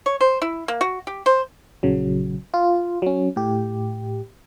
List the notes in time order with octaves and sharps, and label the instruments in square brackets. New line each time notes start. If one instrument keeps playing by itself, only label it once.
[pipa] C#5
C5
E4
A#3
F#4
G4
C5
[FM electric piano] A#1 C#3 F#3
F4
F#3 C#4
A2 G4